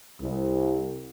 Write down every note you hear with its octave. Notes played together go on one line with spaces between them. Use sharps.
C2